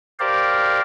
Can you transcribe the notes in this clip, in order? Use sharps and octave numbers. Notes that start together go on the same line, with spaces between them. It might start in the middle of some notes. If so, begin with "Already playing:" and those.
G4 A#4 C5 D5 F5